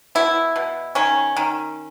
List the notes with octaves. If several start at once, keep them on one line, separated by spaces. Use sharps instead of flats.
B2 E4
B2
D#3 C#4
D#3